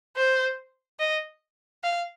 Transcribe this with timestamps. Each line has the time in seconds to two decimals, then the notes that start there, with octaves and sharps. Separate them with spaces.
0.17 C5
1.00 D#5
1.83 F5